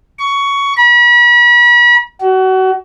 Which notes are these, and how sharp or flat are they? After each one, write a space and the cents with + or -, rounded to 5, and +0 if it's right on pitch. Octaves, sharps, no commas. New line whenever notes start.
C#6 +15
B5 -40
F#4 +30